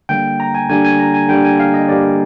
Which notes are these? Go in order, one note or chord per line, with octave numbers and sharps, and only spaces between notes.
D3 G3 A#3 G5
A#5
G#5
D3 G3 A#3 G#5
G#5
A#5
G#5
D3 G3 A#3 G5
G#5
F5
D#5
D3 G3 A#3 D5